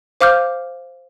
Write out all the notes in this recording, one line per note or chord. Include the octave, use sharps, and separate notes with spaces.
C5 F5 D6 F6 G6